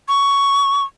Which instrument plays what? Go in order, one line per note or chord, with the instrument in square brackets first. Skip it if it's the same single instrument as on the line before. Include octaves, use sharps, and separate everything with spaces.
[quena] C#6